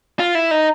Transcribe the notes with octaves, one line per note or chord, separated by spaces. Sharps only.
F4
E4
D#4